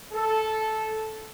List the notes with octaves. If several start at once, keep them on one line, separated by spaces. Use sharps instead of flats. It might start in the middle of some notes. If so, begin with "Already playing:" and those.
A4